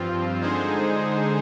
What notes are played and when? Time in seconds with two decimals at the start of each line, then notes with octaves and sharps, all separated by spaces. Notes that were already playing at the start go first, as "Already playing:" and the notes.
Already playing: G2 F3 C4 F4
0.42 D3 G#3 D#4 G#4 C5